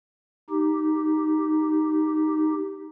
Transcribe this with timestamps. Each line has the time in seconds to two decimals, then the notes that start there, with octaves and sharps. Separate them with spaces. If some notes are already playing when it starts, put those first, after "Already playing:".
0.50 D#4 G4